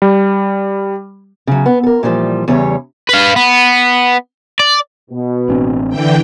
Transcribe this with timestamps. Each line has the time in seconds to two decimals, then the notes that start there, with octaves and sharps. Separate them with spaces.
0.02 G3
1.47 C#3 F#3
1.66 B3
1.83 A4 A#4
2.03 A#2 E3 F3 G3
2.48 E2 C#3 G3 C#5
3.09 B4 F5
3.36 B3
4.60 D5
5.11 B2
5.49 A1 C4 D4
5.89 D3 E3 G5